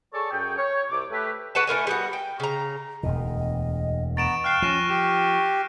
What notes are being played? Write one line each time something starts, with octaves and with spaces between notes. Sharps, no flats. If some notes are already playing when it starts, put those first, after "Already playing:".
G#4 A4 C#5 D5 A5 C#6
F#2 G#4 C#5 G5
C#5
C2 C3 D5 D6
A3 G4 B4
F#4 B4 F#5 A5
A3 E4 A#4 G#5
G3 B3 F#4
G5
C#3 A#5
E1 D2 B2 D#5
B3 A#5 C#6 A6 D7 E7
F5 G5 F6 F#6 C7
F3 C#4 A#6 D#7 E7
G4 D7 E7